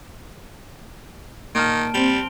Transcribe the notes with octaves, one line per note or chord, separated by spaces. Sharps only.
A#2 D#3 A5 F6 D7
G3 C4 D7 F7 G7